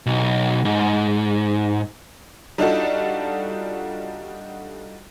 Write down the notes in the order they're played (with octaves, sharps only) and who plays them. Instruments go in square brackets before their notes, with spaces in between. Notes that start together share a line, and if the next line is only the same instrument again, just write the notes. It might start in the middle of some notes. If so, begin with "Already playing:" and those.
[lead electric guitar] B1
G#2
[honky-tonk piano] G3 D4 D#4 F4 F#4 A4